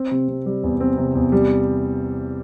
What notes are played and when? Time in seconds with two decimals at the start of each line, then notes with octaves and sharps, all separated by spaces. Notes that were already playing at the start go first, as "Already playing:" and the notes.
Already playing: C4
0.11 C3
0.28 C3
0.46 G3
0.64 E2
0.80 C4
0.98 C3
1.15 E2
1.32 G3